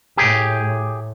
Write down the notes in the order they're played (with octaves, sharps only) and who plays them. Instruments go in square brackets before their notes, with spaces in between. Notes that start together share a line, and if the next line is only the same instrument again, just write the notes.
[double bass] A2 [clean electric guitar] G4 G#4